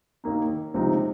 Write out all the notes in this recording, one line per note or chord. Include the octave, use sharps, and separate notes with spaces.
D#2 D#3 A#3 D#4
C#2 C3 F3 C4 D#4